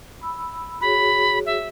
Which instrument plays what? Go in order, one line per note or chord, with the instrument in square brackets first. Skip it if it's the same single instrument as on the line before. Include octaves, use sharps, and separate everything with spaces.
[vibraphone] B5 E6
[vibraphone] F#4 G#4 C#5 [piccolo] B5
[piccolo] E5